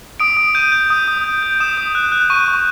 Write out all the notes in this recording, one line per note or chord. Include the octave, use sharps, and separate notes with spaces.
D#6 D7
D#6
G6 D#7
G6
D#6
D#6
G6
G6
D#6 E7
D#6
F#6
F#6
C#6 D#7
C#6